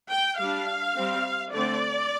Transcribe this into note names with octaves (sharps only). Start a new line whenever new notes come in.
G5
G3 D4 F5
G3 C4
D3 A3 C4 D5